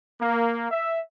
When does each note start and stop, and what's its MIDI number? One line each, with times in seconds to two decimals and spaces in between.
0.21 0.68 58
0.71 0.99 76